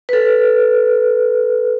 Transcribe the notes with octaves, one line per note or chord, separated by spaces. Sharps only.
A4 B4